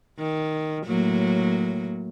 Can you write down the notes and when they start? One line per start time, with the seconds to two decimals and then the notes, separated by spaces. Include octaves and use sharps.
0.19 D#3
0.86 A2 F#3 A#3